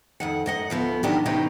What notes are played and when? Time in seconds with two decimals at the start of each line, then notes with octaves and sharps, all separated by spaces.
0.20 F2 D#3 F#5
0.46 F#2 D#5 F#5
0.70 D2 F3 B3
1.03 D#3 E3 F#3 D4 G4
1.26 C3 E3 B3 C#4 D#4 G4